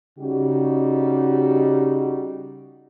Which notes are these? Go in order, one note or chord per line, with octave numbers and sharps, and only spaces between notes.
C#3 G3 D#4 F#4 G4